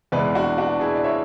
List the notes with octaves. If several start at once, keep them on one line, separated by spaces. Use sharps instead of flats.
E2 B2 G#3 B4 D5
D4 F#4
D4 F#4
E4 G#4
D5
C#5 E5